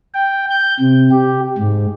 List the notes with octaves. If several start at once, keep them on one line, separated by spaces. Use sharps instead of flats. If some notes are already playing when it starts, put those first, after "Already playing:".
G5
G6
C3
G4
G#2